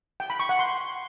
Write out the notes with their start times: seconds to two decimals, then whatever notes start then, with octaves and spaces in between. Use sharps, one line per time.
0.20 G5
0.30 B5
0.40 C#6
0.49 F#5
0.59 C6